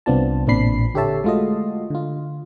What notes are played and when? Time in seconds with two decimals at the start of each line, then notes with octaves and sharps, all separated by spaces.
0.06 C2 B3 C4 D4 F4 A5
0.47 A1 A#2 C4 D4 B5 C7
0.94 D3 G4 A4 C#5 E5 A5
1.24 G#3 A3 F4 F#4 D#5
1.90 D3 F4